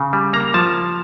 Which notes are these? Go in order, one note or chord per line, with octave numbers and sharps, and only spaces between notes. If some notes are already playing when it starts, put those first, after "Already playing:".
Already playing: C#3
G3
A#3 A#5
F3 A5